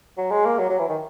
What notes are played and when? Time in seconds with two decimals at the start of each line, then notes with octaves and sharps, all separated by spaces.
0.18 F#3
0.31 G#3
0.45 A#3
0.59 F#3
0.69 F#3
0.79 E3
0.89 D#3